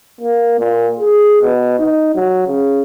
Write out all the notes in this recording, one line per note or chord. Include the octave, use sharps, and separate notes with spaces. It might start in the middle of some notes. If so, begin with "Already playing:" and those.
A#3
A#2
G#4
B2
D#4
F#3
C#3